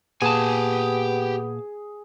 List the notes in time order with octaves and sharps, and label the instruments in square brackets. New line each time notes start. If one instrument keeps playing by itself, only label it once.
[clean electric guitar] A#2 A5 [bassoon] B3 [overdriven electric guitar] G4 G#5 [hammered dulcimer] G#4